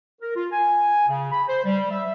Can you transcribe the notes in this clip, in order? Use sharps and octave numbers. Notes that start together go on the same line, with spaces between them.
A#4
F4
G#5
C#3
B5
C5
G3
E5